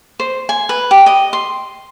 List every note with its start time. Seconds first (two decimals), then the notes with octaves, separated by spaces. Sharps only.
0.20 C5
0.49 G#5
0.69 B4
0.91 G4
1.06 D#5
1.33 C6